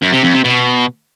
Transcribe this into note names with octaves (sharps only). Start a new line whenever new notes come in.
F#2
C3
F2
C3
B2